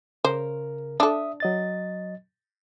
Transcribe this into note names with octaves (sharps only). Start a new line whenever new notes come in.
C#3 A#4 C5
D4 A4 E5 D#6
F#3 D#5 A6